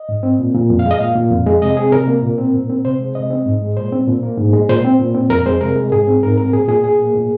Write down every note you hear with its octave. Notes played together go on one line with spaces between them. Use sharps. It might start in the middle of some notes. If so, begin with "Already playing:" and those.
Already playing: D#5
G#2
C4
A#2
A#2
F2
F5
G#3
D#5
A#2 F5
A#2
F2
G#3
C3 D#5
C4 G#4
C3 A#4
A#3
A#2
C4
A#2
C4
C3 C5
G#3
C3 D#5
C4
G#2
G#3
A#2 C5
C4
A#2
A#3
G#2
G#3
A#2 C5
C4
A#2
C4
F2 A#4
G#3 C5
C3 A#4
G#3
G#2 G#4
C4
G#2 A#4
C4 A#4
A#2 G#4
A#2 G#4
A#2 G#4
A#3
A#2